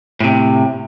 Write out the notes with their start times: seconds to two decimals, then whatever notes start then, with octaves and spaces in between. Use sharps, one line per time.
0.20 A2 C3